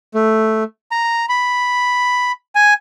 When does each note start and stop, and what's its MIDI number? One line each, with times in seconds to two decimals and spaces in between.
0.14 0.64 57
0.91 1.25 82
1.29 2.32 83
2.55 2.74 80